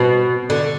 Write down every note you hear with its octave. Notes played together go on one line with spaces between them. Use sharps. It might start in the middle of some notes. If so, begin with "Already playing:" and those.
Already playing: B2
D3